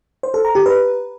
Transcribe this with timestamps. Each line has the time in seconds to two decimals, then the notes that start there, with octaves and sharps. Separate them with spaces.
0.23 C5
0.34 A4
0.45 A#5
0.55 G4
0.66 B4